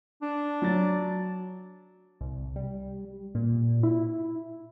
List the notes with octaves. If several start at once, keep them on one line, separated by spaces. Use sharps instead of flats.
D4
F#3 A6
C2
G3
A#2
E4